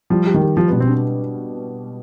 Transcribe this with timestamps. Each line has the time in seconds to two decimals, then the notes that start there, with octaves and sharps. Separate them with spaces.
0.10 F3 G3
0.26 G4
0.34 D#3
0.41 G4
0.57 F3 G4
0.68 B2 B3
0.80 C4
0.87 D4